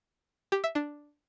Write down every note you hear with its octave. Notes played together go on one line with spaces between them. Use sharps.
G4
E5
D4